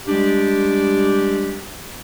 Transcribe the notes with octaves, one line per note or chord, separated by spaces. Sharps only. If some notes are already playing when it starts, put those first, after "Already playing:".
G3 G#3 D4 G4